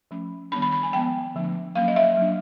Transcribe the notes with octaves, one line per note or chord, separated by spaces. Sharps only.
F3 A3 C#4
D#3 G3 B3 D4 B5
B5
B5
G#5
F3 G#3 B3 G5
D3 F3 A3 D4
F#3 A#3 C#4 F5
D#5
E5
F#3 A#3 D4